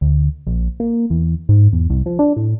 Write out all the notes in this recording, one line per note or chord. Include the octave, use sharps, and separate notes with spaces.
D2
A#1
A#3
E2
G#2
E2
C2
F3
D4
A2